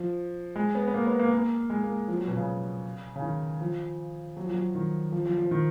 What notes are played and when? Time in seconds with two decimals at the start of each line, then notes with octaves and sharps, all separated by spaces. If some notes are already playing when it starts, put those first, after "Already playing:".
Already playing: F3
0.56 G#3
0.75 B3
0.88 B3
0.94 A#3
1.07 B3
1.19 A#3
1.33 A#3
1.70 G#3
1.84 A#3
2.08 F3
2.17 F#3
2.27 B2
2.37 C#3
3.16 C#3
3.22 D#3
3.61 F3
4.37 F#3
4.45 F3
4.54 F#3
4.75 D#3
5.12 F3
5.26 F3
5.38 F3
5.51 D#3